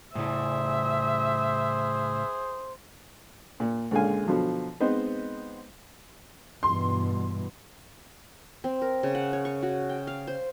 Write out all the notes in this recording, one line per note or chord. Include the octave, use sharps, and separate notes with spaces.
A2 C#3 E4 G#4 C5 E5
A#2
C#2 A#2 D3 G#3 F5 G#5
B2 D3 F3 F#3
G#3 B3 C4 D#4 C5 D#5
G2 B2 E3 C6
C4
A#4
C#3
F#5
C#5
C#6
F#4
G5
F5
C5